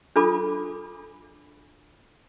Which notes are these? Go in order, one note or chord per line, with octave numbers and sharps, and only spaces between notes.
D4 F4 A4 B5 D6